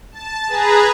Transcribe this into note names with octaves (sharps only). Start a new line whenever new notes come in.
A5
G#4 B4 A#5